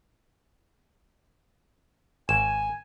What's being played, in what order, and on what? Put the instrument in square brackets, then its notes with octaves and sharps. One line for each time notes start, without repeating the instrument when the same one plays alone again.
[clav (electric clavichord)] G#1 [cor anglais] G#5 [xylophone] E7